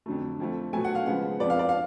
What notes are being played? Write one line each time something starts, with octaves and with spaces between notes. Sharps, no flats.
F2 D3 F#3 A3
F2 F3 A3
B2 F#3 A3 G#5
F#5
F5
C#3 F3 G#3 B3 F#5
F2 F3 B3 D5
F5
D5
F5